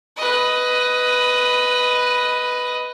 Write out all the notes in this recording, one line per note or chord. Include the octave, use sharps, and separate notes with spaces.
B4 D#5